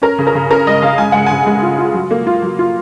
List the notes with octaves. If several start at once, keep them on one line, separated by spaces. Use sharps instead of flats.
C#4 A#4
C#3
A#4
C#3
C#4 A#4
G#3 D#5
C#3 F5
G#3 G#5
G#3 F#5
C#3 G#5
G#3
F4
F4
F#3
A#3
F4
F#3
F4